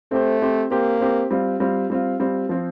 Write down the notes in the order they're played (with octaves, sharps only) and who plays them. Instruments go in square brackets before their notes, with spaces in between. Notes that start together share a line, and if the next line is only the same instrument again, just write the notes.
[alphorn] A3 [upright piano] C4 G4 C5
[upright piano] C4 G4 C5
[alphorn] A#3 [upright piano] C4 G4 C5
[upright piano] C4 G4 C5
G3 C4 F4
G3 C4 F4
G3 C4 F4
G3 C4 F4
F3 C4 F4